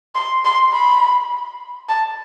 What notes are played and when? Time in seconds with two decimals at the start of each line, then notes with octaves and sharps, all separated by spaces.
0.15 C6
0.45 C6
0.73 B5
1.89 A5